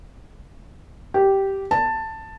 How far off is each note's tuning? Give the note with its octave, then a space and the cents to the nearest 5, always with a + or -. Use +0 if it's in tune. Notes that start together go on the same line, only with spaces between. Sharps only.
G4 -10
A5 +10